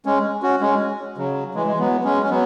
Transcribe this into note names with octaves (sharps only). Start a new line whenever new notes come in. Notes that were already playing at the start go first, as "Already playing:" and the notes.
G#3 C#4
C#4 F#4
G#3 C#4
C#3 F#3
E3 G#3
G#3
F#3 B3
G#3 C#4
C#4
F#3 B3